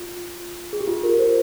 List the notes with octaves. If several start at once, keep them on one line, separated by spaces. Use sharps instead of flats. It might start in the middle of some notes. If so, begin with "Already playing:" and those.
Already playing: F4
G#4
G4
F4
A#4
C5